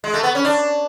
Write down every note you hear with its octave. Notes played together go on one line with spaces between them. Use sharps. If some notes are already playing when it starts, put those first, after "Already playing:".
G#3
A3
B3
C#4
D4